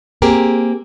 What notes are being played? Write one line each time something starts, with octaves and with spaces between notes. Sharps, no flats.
A#3 C4 G4 G#4 A#4